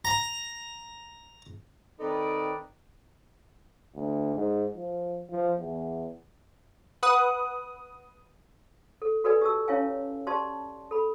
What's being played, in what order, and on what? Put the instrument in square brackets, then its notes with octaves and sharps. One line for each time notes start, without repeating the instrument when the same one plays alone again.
[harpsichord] A#5
[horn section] D#3 C4 D#4 A4 B4 D5
[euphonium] D2
G#2
F3
F3
E2
[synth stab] B4 F#5 D#6
[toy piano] A4
F#4 A4 B4 D5 G#5
G4 A5 E6
C#4 E4 C#5 F5 G#5
G4 D5 A5 C6
A4 B5